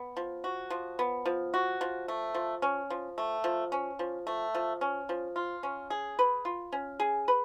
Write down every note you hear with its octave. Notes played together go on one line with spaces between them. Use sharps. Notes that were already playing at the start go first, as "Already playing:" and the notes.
Already playing: B3
F3
F#4
F3
B3
F3
F#4
F3
A3
F3
C#4
F3
A3
F3
C#4
F3
A3
F3
C#4
F3
F4
C#4
G#4
B4
F4
C#4
G#4
B4